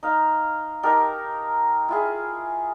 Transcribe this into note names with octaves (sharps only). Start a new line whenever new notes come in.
D#4 F5
D#4 G4 A4 A#4
E4 F4 G#4